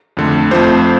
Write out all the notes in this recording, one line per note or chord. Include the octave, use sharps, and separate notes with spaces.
F2 D3 A3
F2 F3 A3 C4 C5